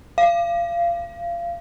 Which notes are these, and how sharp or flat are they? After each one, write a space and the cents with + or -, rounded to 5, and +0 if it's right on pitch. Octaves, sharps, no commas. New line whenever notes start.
F5 -25